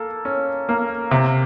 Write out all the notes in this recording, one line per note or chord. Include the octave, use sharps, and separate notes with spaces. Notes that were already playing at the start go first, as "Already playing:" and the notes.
Already playing: A#3 A4
C#4
A#3
C3